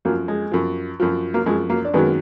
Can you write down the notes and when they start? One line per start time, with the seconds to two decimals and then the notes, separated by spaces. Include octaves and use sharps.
0.05 F#2 F3 F#3 A#3
0.28 G#3
0.52 F#2 F3
1.00 F#2 F3 F#3
1.34 F#3 A#3
1.46 F#2 F3 G#3
1.69 F#3 A#3
1.85 D4
1.94 F#2 D#3 F#3 G#3 B3